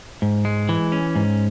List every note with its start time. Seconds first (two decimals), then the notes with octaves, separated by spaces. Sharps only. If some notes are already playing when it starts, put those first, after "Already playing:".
0.22 G#2
0.45 G#3
0.69 E3
0.92 C#4
1.15 G#2